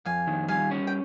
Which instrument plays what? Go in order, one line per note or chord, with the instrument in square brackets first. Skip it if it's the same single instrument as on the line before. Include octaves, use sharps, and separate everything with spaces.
[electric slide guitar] F2 [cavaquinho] F5 G#5
[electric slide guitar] D#3
[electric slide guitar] G3 [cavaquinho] F5 G#5
[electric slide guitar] C#4
[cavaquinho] G5